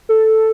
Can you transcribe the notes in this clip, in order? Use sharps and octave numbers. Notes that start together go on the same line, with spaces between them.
A4